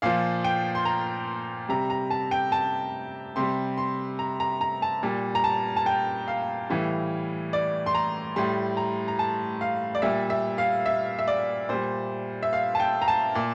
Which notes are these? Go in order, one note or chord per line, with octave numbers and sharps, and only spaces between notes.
A#2 F3 F5
G5
C6
A#5
C3 G3 A#5
A#5
A5
G5
A5
C3 G3 C6
C6
A#5
A#5
A#5
A5
A#2 G3
A#5
A5
A5
G5
F5
A2 E3 G3
D5
C6
A#5
A2 G3 C6
A#5
A#5
A5
F5
D5
A#2 G3 E5
E5
F5
E5
E5
D5
A#2 G3 C5
E5
F5
A5
G5
A#5
A5
A#2